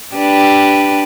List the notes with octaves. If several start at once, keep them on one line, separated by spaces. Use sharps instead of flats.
D4 G4 B4